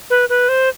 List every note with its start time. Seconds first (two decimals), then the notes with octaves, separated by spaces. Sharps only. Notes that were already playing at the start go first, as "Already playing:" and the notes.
0.10 B4
0.29 B4
0.49 C5